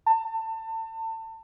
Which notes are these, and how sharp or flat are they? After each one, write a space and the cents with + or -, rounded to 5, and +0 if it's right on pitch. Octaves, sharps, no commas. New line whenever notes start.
A5 +30